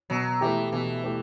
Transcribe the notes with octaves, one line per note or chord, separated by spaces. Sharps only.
B2 F#3
E3 A3 E4 G4
B2 E3
A3 E4 G4